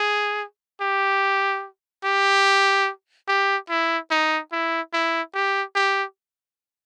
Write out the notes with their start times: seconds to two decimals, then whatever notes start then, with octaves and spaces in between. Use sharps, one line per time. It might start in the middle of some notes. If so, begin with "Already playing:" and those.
Already playing: G#4
0.81 G4
2.04 G4
3.28 G4
3.69 E4
4.11 D#4
4.52 E4
4.93 E4
5.34 G4
5.75 G4